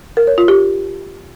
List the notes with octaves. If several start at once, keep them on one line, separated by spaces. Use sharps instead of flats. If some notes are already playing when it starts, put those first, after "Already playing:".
A#4
C#5
F4
G4